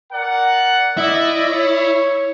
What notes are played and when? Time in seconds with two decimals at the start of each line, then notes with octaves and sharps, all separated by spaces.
0.13 A#4 D5 F#5
0.98 E4 D5 D#5
1.49 C#5